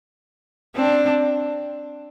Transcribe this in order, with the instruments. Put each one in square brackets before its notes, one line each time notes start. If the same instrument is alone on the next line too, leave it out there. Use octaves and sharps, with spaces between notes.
[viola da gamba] C4 D4